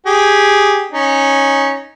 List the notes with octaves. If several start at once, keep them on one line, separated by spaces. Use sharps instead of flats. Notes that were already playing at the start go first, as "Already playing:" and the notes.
G4 G#4
C#4 D#4